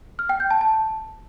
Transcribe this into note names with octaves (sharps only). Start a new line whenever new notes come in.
F6
G5
G6
A5
A5